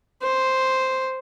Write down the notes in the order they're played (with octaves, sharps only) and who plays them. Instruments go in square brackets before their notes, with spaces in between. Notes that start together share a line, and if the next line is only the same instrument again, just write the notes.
[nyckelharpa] C5